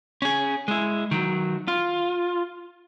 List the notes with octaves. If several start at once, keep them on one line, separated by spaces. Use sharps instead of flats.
C#4 G#4
G#3 E4
D#3 F#3
F4